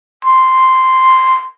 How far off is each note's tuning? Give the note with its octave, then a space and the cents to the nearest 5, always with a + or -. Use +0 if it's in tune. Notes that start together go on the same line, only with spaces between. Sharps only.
C6 -5